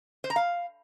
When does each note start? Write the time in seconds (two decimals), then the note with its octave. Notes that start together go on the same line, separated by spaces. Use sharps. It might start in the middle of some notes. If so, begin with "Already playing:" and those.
0.24 C5
0.30 A#5
0.36 F5